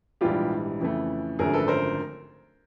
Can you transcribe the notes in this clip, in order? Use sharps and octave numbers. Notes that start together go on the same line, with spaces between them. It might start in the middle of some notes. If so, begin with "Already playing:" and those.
A#1 G#2 E3 G3 F4 G4
F2 C#3 E3 A3
G#1 F#2 D3 F3 A3 G#4 A#4
A4 B4
A#4 C5